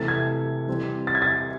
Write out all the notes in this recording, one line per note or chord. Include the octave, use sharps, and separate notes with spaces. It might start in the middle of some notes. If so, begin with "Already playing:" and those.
Already playing: C3 E3 A3 C4 A6
G#6
E3 G3 C4
A6
G#6
A6